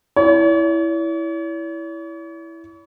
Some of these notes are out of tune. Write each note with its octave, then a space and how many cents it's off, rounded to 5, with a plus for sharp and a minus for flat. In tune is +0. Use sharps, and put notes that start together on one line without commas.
E4 +0 C#5 +45